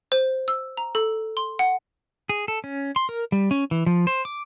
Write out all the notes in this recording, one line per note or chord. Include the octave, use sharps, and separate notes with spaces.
C5
E6
A#5
A4
C6
F#5
G#4
A4
C#4
C6
A#4
G3
C#4
E3
F3
C5
D6